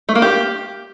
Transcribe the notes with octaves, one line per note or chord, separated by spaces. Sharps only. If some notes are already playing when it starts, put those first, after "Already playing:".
A3
A#3
G4